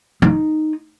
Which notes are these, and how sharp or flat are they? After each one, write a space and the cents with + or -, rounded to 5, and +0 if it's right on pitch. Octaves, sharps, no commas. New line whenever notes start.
D#4 -5